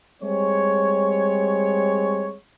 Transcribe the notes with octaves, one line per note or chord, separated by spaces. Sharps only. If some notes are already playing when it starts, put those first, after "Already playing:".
G3 G#3 C4 C#5